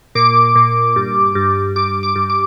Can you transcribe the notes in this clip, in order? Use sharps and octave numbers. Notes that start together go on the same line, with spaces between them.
A#2 D6
A#2
G2
G2
G2 D6
D6
G2
D6